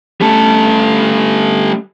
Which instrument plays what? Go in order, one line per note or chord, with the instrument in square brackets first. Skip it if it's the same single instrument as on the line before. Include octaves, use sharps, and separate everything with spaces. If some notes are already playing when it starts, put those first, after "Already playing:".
[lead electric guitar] G3 A4 [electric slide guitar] A3 C#4 G4